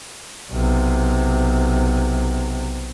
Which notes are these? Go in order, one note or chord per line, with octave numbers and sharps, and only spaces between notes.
B1 C3